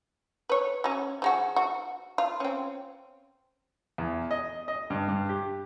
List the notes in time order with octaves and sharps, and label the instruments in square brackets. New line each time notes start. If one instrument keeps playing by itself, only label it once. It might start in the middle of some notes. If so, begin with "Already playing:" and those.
[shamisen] B4 C#5
F#3 C#4
F3 G#3 F#4
F#4
F4
C4 C#4
[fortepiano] E2
D#5
D#5
G2
G2
G4